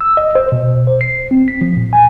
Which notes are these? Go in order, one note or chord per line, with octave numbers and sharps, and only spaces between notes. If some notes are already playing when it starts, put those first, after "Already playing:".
E6
D#5
C5
B2
C5
C7
C4
B6
F3
A#2
G#5